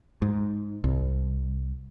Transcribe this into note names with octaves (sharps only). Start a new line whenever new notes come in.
G#2
C2